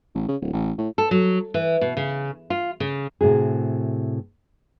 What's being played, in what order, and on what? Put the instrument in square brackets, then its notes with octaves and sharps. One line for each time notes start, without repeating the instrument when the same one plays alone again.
[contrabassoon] A1
C#3
D1
A1
A2
[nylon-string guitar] A4
F#3
E3
B2
C#3
F4
C#3
A2 C3 F#4 G#4